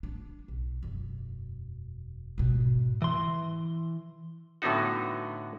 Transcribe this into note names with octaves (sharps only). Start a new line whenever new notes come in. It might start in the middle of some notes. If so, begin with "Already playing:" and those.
D4
B1
E1 F#2
G#2 B2
E3 C6
A2 D3 F#3 B3 D#4 F#4